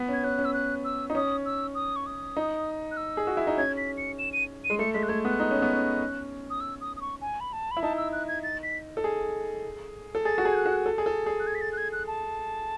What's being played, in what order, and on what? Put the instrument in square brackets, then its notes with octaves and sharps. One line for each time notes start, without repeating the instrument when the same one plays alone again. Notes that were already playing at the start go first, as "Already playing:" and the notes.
Already playing: [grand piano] B3
[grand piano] C#4 [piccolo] G#6
[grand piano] C#4 [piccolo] F#6
[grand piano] C#4
[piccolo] E6
F#6
E6
[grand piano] D#4
[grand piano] C#4 [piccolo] D#6
[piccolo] E6
D#6
C#6
D#6
[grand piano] D#4
[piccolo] F#6
E6
[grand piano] G#4
F#4
E4
D#4
[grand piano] C#4 [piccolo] G#6
[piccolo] B6
C#7
E7
D#7
D#7
[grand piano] G#3
[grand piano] A3 [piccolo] C#7
[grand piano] G#3 [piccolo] B6
[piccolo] F#6
[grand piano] A3 [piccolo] G#6
[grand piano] B3 [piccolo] F#6
[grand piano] D#4
C#4
B3
C#4
[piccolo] D#6
E6
D#6
D#6
C#6
G#5
B5
A5
B5
[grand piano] E4
[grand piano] D#4 [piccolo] A5
[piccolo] E6
F#6
G#6
A6
B6
[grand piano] A4
G#4
A4
[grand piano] G#4 [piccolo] A6
[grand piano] F#4
G#4
[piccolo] G#6
F#6
[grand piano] F#4
A4
G#4
A4
G#4
[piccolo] F#6
G#6
B6
A6
F#6
G#6
F#6
A5